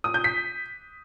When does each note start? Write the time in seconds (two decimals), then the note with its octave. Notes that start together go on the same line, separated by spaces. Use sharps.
0.04 D#6
0.14 G6
0.24 B6